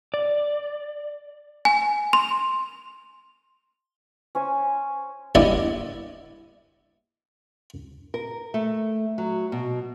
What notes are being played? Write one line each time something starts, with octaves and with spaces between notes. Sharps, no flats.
D5
G#5
C6
C#4 C5 G#5
A#1 G2 B3 E4 D5 D#5
A#4
A3
F#3
B2